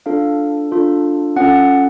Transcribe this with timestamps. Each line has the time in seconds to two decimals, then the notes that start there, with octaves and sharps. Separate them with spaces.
0.06 D4 F4 A4 F5
0.72 D4 F4 A4
1.36 C#4 F4 A4 F#5